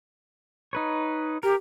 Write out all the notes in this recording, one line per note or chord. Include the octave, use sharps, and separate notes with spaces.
D#4 B4 C#5
G4 A#4